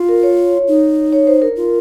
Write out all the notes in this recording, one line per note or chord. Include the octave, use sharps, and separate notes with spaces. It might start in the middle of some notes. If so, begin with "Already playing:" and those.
Already playing: F4
A#4
C#5
D#4
C#5
C5
A#4
F4